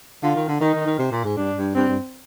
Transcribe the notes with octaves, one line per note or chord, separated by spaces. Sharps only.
D3 F4
D#3
D3
D#3 D#4
D#3
D#3
C3
A#2
G#2
G2 D4
G2
G2 C4
G2